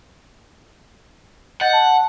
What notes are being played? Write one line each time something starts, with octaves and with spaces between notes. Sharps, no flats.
D#5 F#5 G6 A6
A5